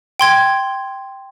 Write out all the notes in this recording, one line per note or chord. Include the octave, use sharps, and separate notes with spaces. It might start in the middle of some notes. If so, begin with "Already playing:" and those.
G5 C6 G#6